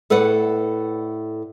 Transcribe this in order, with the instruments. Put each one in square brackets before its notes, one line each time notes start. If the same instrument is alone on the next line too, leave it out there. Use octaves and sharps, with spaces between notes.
[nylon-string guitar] A2 A4 B4 D5 F#5